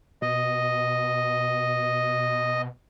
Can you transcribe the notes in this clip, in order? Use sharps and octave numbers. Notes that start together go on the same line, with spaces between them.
B2 D#5